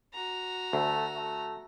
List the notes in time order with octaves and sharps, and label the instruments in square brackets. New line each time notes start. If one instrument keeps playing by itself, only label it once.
[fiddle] F#4 A#5
[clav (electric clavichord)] D2 [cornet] A3
[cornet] A3